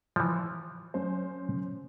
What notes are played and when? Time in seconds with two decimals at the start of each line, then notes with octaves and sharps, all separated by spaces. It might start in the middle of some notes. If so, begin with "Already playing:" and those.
0.16 E3 F3
0.94 F#2 C5